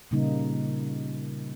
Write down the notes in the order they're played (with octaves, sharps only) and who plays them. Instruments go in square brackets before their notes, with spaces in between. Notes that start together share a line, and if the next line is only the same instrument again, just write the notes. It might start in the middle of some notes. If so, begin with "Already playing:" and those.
[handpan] A#2 C#3 G3 A#3 D#4